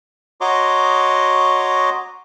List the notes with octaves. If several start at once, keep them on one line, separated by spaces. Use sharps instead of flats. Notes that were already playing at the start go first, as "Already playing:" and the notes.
F#4 C#5 D#5 A#5 C6 D6